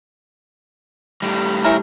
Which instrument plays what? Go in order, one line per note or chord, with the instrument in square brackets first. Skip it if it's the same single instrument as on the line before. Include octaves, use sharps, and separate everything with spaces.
[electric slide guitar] A2 G3
[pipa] C#4 E4 A#4